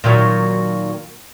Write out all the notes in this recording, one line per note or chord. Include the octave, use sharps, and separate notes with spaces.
A#2 D#3 F#3